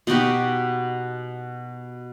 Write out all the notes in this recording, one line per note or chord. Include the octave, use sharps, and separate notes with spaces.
B2 D#4 F#4 G4